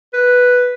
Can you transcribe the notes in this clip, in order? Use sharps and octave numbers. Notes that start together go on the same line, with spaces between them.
B4